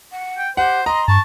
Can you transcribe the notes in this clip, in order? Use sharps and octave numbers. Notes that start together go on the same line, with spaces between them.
F#5
G5
G4 C5 F#5
D#5 A#5 C6
G2 A5 C#6